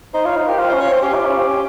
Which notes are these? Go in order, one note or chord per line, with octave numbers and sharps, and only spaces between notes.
D#4 C5
F4 C#5
D#4 C5
G4 A#4
F4 C5
C#4 C5
C#5
C4 C5
C#4 G4
F4
C#4
C4
C#4